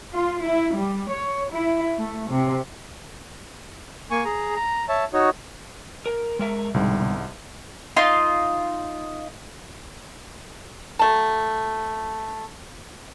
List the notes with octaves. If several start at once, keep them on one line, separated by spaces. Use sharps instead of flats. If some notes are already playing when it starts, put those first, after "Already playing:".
F4
E4
G3
C#5
E4
A3
C3
A#3 G#5 C#6
G#4 A#5
A#5
C#5 E5 A5
D#4 F#4 C#5
A#4
G#3 A#4 E5
C2 G#2 B2 D3 G3
D#4 F4 C6
F#3 A3 A5